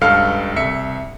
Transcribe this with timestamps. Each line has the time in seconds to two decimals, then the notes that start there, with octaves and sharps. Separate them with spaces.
0.01 C#2 G2 A4 F5 F6 C#7
0.56 C2 E5 C#7